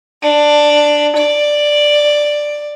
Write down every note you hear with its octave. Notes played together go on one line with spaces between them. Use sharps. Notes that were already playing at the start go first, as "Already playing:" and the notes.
D4
D5